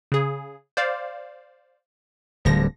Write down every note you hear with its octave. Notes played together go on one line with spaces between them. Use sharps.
C#3 G#4
C5 D5 F5
D1 D3 F3 G3 A#6